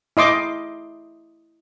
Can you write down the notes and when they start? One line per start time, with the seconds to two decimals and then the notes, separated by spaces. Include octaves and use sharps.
0.17 E4 D#5 C6 D6